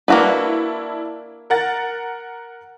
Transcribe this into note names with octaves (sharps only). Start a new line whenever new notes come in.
A#3 D4 E4 F#4 B4 A5
A#4 F#5 A6